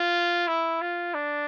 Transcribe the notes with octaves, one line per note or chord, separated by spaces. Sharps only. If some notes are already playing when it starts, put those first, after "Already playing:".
Already playing: F4
E4
F4
D4